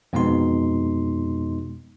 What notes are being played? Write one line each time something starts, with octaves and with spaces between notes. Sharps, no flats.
F2 B2 G#3 B3 D#4 C6